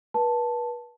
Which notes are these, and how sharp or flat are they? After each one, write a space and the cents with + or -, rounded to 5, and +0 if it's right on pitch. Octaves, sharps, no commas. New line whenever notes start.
B4 -35 A5 +0